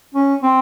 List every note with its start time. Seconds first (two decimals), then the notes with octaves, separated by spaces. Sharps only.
0.15 C#4
0.43 C4